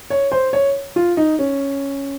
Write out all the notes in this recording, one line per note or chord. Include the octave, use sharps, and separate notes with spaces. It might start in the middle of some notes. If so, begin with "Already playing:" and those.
C#5
C5
C#5
F4
D#4
C#4